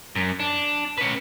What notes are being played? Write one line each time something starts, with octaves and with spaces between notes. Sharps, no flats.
F#2
D4
C#4 B4